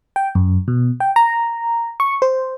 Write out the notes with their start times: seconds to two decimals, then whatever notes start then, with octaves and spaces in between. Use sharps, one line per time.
0.16 G5
0.35 F#2
0.68 B2
1.00 G5
1.16 A#5
2.00 C#6
2.22 C5